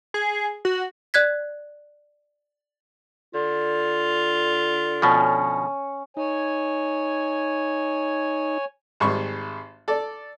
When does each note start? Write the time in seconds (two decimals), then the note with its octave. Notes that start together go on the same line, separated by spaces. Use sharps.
0.14 G#4
0.65 F#4
1.14 D5 F#6 G#6 B6
3.34 D3 F4
5.02 B2 F3 C#4 C#6
6.17 D#4 C#5 G#5
9.00 G#1 G#2 G3 C#6
9.88 A4 D5